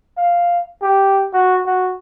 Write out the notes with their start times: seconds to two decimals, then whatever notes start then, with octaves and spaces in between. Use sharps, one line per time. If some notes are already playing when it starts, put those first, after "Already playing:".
0.17 F5
0.82 G4
1.33 F#4
1.66 F#4